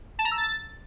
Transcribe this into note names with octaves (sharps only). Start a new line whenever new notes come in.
A5
A#5
E6
A6